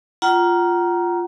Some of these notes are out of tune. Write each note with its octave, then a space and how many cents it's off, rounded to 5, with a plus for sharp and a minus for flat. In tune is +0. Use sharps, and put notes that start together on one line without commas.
F4 +0 F#5 +35 A#5 +10